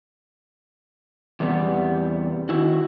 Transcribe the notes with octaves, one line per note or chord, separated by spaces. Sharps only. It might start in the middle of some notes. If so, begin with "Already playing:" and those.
E2 C3 G3 B3
D#3 E4 F#4